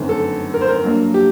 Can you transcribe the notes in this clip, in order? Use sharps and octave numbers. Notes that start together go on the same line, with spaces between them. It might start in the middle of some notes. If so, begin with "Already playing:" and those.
Already playing: G1 F#2 D#3 A3 C4
A4
A#4
C5
A#4
G2 F#3 A#3
G4